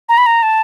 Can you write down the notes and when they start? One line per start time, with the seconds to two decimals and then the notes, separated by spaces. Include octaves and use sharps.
0.09 A#5
0.18 B5
0.26 A#5
0.43 A5